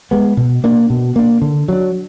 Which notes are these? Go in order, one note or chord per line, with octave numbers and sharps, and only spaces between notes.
G#3 B3
B2
A#3 D4
B2
A#3 D4
D3
F#3 D4